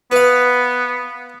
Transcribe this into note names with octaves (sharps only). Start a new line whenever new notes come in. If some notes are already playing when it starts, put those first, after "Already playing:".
B3 B4 F5